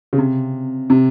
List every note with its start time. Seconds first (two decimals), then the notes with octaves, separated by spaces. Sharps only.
0.13 C#3
0.18 C3
0.90 C3